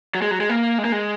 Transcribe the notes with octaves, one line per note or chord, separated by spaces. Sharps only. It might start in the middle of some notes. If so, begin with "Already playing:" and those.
F#3
G#3
F#3
G#3
A#3
G#3
A#3
G#3